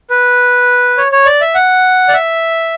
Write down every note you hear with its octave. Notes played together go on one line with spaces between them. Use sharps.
B4
C#5
C#5
D5
E5
F#5
D5
E5